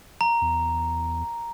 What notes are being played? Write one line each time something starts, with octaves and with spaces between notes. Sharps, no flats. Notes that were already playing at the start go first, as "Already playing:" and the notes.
A#5
E2